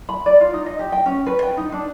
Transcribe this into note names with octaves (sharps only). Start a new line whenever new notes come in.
B5
D5
F4
D#4
D#5
G4
G5
C#4
B4
G5
D#4
D4